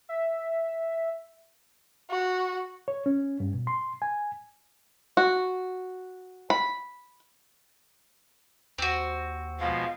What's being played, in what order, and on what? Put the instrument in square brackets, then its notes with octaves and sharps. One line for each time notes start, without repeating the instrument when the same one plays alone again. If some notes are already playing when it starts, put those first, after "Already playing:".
[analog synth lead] E5
[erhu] F#4
[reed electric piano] C#5
C#4
G2
B2
C6
G#5
[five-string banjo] F#4
B5
[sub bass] D#2 [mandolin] C4 F#4
[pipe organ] B2 F3 G#3 [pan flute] F5